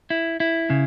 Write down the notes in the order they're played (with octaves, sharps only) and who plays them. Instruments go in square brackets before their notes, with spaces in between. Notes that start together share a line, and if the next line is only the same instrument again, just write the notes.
[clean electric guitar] E4
E4
C#3